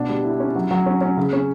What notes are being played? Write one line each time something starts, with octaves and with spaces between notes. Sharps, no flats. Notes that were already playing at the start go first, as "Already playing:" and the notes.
Already playing: B2 D4
G3
E4
C#4
F#3
F#3
C#4
C#4
C#3
C#4